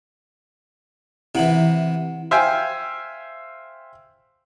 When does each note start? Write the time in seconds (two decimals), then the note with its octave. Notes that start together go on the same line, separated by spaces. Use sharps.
1.35 C3 E3 E4 F#5 F#7
2.31 C5 E5 F5 G5 G#5